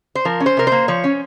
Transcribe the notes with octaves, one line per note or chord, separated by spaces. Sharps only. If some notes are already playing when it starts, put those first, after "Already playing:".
C5
F3 A#4
C#4
C5
C3 A#4
A#3 C5
F3 C#5
C#4